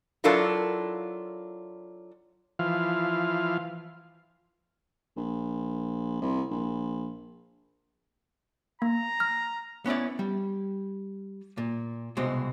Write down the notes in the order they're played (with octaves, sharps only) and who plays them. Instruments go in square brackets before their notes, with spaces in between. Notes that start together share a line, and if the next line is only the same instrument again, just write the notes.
[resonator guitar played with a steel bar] F#3 D4 E4 F4 A4 A#4
[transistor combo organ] E3 F3 F5
[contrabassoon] A#1
C2
A#1
[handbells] A#3 [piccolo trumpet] A#5
[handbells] F6
[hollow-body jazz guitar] B3 C#4 E4 D5
G3
A#2
C2 B2 G#3 C4